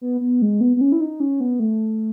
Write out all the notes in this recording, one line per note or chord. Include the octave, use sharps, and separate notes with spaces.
B3
B3
G#3
B3
B3
C#4
E4
D#4
C#4
B3
A3